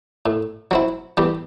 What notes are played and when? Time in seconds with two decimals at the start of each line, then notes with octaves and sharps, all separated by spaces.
0.26 A2
0.71 F#3 C4 E4
1.17 E2 G3 G4